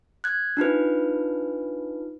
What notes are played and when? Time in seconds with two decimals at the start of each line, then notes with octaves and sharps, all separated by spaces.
0.24 F#6 G#6
0.57 D4 D#4 F4 B4